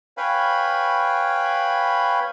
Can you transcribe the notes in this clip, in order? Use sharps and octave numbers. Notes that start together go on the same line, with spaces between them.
B4 C#5 F5 G5 G#5 B5